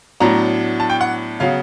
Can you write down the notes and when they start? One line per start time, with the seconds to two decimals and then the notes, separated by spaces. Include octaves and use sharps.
0.20 A2 F#3 B3 D4 A#5
0.80 A5
0.90 G5
1.01 F#5
1.40 C#3 F#3 B3 F5